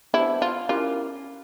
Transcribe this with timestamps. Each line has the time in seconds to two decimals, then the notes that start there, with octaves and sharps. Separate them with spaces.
0.13 B3 D4 E4 G4 C5 E5
0.42 F4
0.69 C#4 E4 F4 G4 A#4